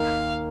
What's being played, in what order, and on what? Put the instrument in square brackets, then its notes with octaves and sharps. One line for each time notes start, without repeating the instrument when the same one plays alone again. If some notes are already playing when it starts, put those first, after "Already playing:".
Already playing: [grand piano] D#2 D#3 A#3 D#4 [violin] F5